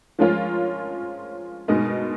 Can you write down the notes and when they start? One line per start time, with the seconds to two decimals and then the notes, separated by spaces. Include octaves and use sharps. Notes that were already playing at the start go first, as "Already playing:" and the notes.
0.19 F3 G#3 C#4 F4 A#4
1.68 B2 G#3 D#4 A#4 D#5